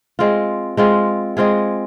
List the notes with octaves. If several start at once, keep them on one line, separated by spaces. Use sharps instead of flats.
G#3 C4 F4
G#3 C4 F4
G#3 C4 F4 G#4